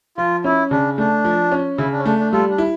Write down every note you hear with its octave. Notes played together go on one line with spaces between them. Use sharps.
F3 F4
C#4 E4
C#3 D4
A3 D4
F3
C#4
C#3 E4
D4
C#4
A3 D4
D4
G3 F4 A4
D4
E4